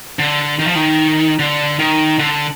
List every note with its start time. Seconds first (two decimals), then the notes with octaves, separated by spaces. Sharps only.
0.19 D3
0.59 D#3
0.67 F3
0.75 D#3
1.39 D3
1.79 D#3
2.19 D3